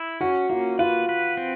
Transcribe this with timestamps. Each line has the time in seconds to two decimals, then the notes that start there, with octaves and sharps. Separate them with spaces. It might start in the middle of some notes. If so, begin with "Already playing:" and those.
Already playing: E4
0.21 C#4 F#4
0.49 A#3 F4
0.79 F4 B4
1.09 B4
1.37 C4